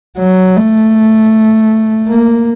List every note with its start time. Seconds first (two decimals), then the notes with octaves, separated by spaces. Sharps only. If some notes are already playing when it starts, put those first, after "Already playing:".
0.18 F#3
0.56 A3
2.07 A#3